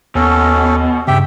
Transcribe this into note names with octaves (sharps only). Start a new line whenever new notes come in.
D#2 B2 C#4 A4
G2 C#3 G4 E5 G5